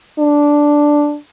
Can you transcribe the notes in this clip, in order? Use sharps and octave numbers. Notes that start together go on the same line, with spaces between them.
D4